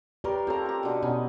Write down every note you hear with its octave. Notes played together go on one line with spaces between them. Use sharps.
G4 A#4 B4 C#5 D5 C6
C4 F4 A4 C#5 A#5
G4 A#5
B2 D3
B2 B3 C#4 D#4